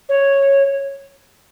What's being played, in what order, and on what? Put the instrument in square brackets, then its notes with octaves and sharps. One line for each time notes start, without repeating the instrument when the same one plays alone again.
[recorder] C#5